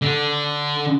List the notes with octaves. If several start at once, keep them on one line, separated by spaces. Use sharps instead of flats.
D3